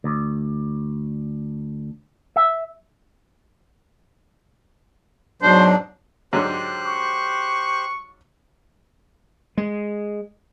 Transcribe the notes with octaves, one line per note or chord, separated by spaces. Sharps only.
D2
E5
G#2 B2 F#3 D4 C5
G#2 D3 F#3 G4 C5 F#6
C#6
G#3